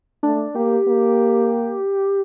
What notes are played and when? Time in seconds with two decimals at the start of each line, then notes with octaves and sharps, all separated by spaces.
0.23 A3 D4
0.55 A#3 G4
0.88 A#3